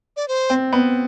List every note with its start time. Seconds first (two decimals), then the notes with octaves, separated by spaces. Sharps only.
0.17 D5
0.28 C5
0.50 C4
0.73 B3